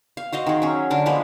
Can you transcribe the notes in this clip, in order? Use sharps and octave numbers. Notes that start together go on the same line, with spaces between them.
F5
F#4 C5 D#5 F5
D#3 G#4
F#3 C#4
D3 D4 A#4
F3 G#3 A#3 B4